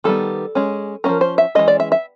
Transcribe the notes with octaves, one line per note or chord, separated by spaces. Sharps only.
D#3 G3 B3 A4
G#3 C#4
F3 A#3 C#4 A#4
C5
E5
E3 G#3 C#4 D#5
D5
E5
E5